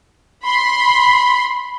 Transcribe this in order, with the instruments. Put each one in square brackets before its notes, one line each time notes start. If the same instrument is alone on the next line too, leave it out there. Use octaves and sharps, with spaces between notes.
[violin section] B5 C6